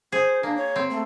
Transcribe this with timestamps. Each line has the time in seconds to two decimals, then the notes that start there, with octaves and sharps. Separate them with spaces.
0.12 G#4 C5
0.43 A#3 D4
0.57 C#5
0.76 C4
0.90 A3